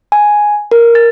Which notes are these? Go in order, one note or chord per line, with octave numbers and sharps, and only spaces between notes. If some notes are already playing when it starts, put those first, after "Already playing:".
G#5
A#4
A6